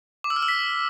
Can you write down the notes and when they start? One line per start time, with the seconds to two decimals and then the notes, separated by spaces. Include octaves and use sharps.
0.24 D6
0.30 E6
0.36 F6
0.42 E6
0.48 B6